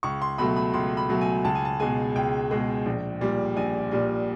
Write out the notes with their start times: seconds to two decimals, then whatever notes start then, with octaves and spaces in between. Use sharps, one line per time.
0.03 C#2 C#6
0.22 C6
0.38 B2 F#3 A3 B5
0.56 B5
0.74 C#2 C6
0.97 B5
1.09 B2 F#3 A3
1.21 G#5
1.44 C#2 A5
1.55 G#5
1.65 A5
1.80 B2 G#3 G#5
2.15 C#2 G5
2.51 B2 G#3
2.86 A#1
3.21 A#2 G3
3.56 A#1 G#5
3.92 A#2 G3